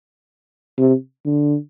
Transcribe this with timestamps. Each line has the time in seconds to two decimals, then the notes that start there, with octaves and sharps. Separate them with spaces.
0.78 C3
1.26 D3